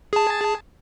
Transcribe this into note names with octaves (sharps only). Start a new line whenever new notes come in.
G#4 A5